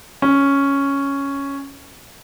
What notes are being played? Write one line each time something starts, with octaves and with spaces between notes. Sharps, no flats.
C#4